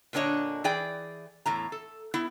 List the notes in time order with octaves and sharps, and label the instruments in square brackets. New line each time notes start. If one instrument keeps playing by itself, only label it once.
[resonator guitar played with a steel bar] A#2 D3 B3 D4 C#5 D#5
E3 G#4 D5 G5
E2 A2 A#5
A4
B3 E4